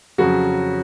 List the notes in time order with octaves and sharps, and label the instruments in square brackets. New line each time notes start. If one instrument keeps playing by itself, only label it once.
[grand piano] F2 C#3 F#3 F#4